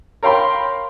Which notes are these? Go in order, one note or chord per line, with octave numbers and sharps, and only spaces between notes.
A#4 C#5 F5 G5 B5 C6